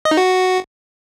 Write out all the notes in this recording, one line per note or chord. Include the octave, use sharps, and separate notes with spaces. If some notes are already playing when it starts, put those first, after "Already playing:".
D#5
D#4
F#4